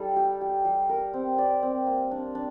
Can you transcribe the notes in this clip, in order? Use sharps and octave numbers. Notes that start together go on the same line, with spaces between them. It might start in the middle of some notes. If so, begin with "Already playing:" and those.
Already playing: G3 D#4 A4
G4
G4
G3
A#4
C4
D5
C4
A#3
D4
D4